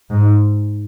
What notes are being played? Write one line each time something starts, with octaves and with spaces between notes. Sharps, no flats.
G#2